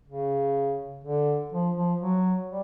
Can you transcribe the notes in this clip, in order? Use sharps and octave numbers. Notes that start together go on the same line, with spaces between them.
C#3
D3
F3
F3
F#3
G3